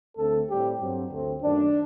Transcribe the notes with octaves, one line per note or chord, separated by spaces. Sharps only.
D2 D3 A3 C4 A4
A2 G3 C4 G4
G2 F#3 C4
D2 D3 A3 C4
F#2 D#3 A3 D4